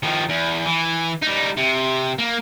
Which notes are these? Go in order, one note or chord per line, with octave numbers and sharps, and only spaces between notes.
D#3 F3
E2
E3
G3 D#4
C3
A#3